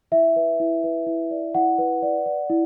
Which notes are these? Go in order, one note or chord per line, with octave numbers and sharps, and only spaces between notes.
E4 E5
B4
E4
B4
E4
D5
E4 F#5
B4
D5
D5
E4